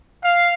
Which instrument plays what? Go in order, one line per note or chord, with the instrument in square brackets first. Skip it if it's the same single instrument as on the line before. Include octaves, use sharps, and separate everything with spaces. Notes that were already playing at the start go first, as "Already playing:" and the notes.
[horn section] F5